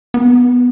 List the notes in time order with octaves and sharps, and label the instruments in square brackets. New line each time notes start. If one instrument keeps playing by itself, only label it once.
[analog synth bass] B3